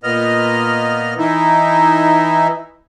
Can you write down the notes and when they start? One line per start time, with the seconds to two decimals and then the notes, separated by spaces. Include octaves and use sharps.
0.03 A#2 B3 D#5 F6
1.18 E3 D#4 E4